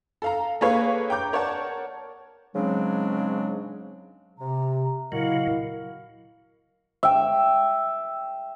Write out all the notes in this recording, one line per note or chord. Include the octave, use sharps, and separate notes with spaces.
A4 F5 A#5
A#3 G#4 A4 B4 C#5 F5
G5 A#5 D6 G6
A#4 C#5 D5 F#5 A5
G#2 C#3 F#3 G#3 C4 D4
C3 A#5
A#2 C#3 F#3 E4 F#4 A#4 D#5 F5
E5 G5